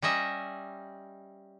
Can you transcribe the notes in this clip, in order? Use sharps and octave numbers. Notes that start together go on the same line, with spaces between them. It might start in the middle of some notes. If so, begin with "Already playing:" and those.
G3 C#4 D#5 E5